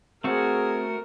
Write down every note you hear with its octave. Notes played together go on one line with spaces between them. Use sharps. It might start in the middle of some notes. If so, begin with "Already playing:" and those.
A3 C4 F#4 G#4 A#4 C5